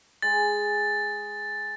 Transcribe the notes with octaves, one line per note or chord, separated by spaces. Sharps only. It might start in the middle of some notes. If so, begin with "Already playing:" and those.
G#3 G#5 A6